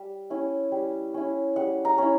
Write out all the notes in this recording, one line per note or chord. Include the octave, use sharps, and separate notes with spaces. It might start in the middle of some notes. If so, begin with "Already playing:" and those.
Already playing: G3
C#4 E4
G3
C#4 E4
G3 F#5
A#5
C#4 E4